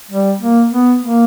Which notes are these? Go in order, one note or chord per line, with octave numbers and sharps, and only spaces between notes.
G3
A#3
B3
A#3